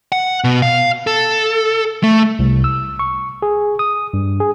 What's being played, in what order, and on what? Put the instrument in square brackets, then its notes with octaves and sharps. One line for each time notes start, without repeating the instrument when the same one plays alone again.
[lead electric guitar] F#5
B2
F5
A4
A3
[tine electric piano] C2
E6
C#6
G#4
D#6
G2
G#4